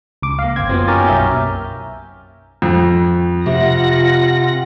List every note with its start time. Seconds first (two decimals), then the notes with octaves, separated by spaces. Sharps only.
0.22 C#2 D6
0.39 A#3 F5 C7
0.56 G1 C4 G#6
0.69 F#2 B3 C4 F4
0.87 C#4 D#4 G4 A#4 A6
1.07 B1 E5 G6
2.62 F2
3.46 C3 F4 F#5 A#6